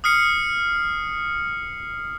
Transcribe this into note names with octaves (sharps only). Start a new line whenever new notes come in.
D#6 F6 C7 C#7